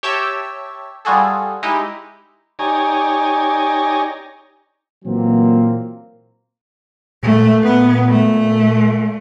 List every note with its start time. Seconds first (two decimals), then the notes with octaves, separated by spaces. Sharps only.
0.03 G4 C#5 E5 G5 A5 E6
1.05 G3 F4 F#4 G#4 A4
1.63 G#3 D#4 E4 G4 D#5
2.59 D#4 G4 C#5 D5 G#5 A#5
5.05 A#2 E3 F#3 A#3 C4
7.23 A#2 A3
7.63 B3
8.09 A3